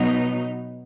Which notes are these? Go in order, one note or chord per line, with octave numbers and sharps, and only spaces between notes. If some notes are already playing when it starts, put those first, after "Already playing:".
Already playing: B2 F#3 B3 D#4